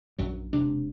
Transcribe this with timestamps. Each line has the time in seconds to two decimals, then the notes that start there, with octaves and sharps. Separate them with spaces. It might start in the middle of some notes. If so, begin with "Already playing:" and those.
0.18 A#1 F#2 F#3
0.53 E1 C2 C3 D4